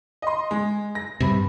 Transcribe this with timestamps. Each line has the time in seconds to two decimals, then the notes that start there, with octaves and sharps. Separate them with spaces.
0.22 D#5 C6
0.51 G#3
0.95 A#6
1.20 G2 C3 G4 B5